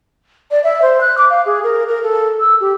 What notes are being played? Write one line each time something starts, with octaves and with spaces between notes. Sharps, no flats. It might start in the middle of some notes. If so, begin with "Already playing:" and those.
D5
E5
C5
F#6
D6
F5
G#4
A#4
A#4
A4
E6
G4